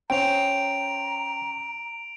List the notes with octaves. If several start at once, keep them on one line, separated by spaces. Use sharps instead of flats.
C#4 C5 G5 A#5 D7 F7